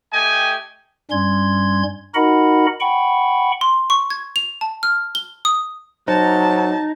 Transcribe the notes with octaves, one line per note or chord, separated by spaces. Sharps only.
A3 G4 D#5 G5 G#5
G2 G3 C#4 C6 G#6
D#4 F#4 A#4 D#5 F#5 B5
F#5 G5 B5 C#6
C6
C#6
G#6
F7
A5
F6
G7
D#6
F#3 D#4 C5 A5